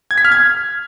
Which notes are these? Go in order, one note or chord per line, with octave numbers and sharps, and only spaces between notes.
G#6
B6
F6
G#6